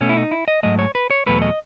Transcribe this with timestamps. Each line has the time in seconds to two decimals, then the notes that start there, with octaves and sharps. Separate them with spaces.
0.01 B2 A3 C#4
0.09 E4
0.17 D#4
0.31 E4
0.48 D#5
0.63 G#2 F#3 A3 D#5
0.79 C#5
0.95 B4
1.10 C#5
1.26 E2 B2 F#3 A3 B4
1.42 D#5